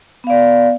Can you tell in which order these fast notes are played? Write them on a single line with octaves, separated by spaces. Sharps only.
B3 F5 D5